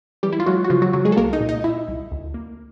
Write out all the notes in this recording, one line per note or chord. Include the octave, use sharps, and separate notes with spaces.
E3 G3 G4
E4
F4
F#3 G#3 F#4
F#4
C#3 F3 F4
F#3 F#4
C#3 F#3 F#4
G#3 G#4
A4
C2 A#3 A#4
D#4 D#5
A#2
D#4 D#5
A#2 E4 E5
C2
D2
A#3